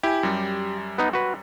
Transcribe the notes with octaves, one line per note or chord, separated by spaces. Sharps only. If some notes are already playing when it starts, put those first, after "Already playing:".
E4 G4 G#5
F#2 G3
B3 D#4
F#4 B4